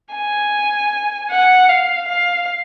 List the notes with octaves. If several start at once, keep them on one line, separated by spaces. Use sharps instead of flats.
G#5
F#5
F5
F5